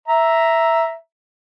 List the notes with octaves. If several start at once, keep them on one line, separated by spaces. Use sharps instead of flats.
E5 A#5